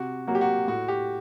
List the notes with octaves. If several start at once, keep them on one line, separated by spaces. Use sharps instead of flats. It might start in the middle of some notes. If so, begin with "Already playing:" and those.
Already playing: C3 F#4
F#3 A#3 F#4
G4
F#4
A2 F#4
G4